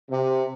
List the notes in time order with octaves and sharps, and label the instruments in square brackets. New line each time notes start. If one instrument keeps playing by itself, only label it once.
[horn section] C3